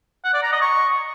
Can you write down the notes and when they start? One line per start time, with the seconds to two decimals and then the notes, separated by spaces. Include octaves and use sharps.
0.25 F#5
0.34 D5
0.43 A#5
0.52 D#5
0.62 C#6